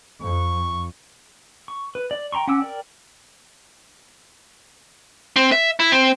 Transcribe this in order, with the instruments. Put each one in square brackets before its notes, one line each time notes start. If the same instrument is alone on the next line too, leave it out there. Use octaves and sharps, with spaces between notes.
[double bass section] F2 [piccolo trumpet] C#6
[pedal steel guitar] C#6
B4
D5
G5 A#5 C6 C#6
C#4 F#5 D6 E6
A#4 D5 G5
[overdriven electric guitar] C4
E5
E4
C4